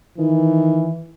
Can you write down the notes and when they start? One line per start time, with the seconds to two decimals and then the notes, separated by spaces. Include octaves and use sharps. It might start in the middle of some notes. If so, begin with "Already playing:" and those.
0.19 D#3 E3